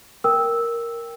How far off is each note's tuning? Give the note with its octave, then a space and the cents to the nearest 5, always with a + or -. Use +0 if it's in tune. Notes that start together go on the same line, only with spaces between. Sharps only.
A#4 +0 G5 +0 E6 -5